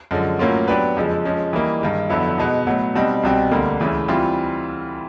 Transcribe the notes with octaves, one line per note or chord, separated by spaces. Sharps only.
F#2 D3 F3 G#3
A2 F#3 A#3 C#4 F4
F#3 B3 D4 G4 B4
F2 C#3 F3 G#3
F3 G#3 C#4
E3 G3 A#3 D#4
G2 D#3 G#3
F2 D3 F#3 B3 E4
B2 G#3 B3 D#4
A2 F#3 B3
B2 G3 C4 D#4
C2 B2 G3 C4
D2 D3 G3 A#3
D2 C#3 E3 A3
E3 G3 C4 F4